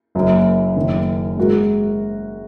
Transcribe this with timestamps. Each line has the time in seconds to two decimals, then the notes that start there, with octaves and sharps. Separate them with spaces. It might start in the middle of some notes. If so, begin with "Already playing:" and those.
0.15 F#1 F#2 F#3 A#3
0.76 F#1 F#2 D#3 F#3
1.37 G#2 G#3 F#4 A#4